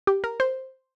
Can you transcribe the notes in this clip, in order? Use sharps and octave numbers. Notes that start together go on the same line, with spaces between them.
G4
A#4
C5